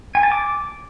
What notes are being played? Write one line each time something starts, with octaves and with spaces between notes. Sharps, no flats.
G#5
A5
D6